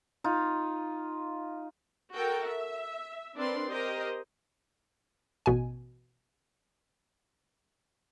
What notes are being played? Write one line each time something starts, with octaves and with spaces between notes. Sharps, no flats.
D#4 F4
F#4 A4 A#4 G5
E5
C4 D4 A#4 B4 D5 C6
G4 A#4 C5 D#5
A1 B2 G#5